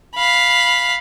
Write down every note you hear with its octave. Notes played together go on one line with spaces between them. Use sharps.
F5 B5